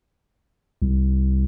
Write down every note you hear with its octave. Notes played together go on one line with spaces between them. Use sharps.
C2